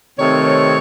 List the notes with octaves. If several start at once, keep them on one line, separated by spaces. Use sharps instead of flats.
C3 D#3 A3 C4 C#5